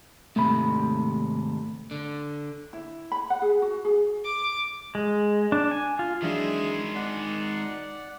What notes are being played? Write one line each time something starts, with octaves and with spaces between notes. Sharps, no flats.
D#2 G#2 C3 A3 B5
D3
E4
B5
F#5
G#4
F#4
G#4
D6
G#3
D4
G#5
F4
D#3 E3 F#3 G#3 D4 G#4 E5
D#4 D5 F#5 F#6 B6